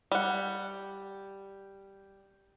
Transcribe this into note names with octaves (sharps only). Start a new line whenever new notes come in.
G3 F#5